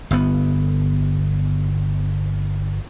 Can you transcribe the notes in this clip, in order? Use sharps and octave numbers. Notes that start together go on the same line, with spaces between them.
G1 B3